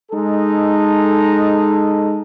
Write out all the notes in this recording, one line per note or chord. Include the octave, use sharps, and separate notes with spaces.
G#3 D#4 A4